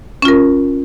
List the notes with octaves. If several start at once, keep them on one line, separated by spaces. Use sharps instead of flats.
C#4 F4 A#4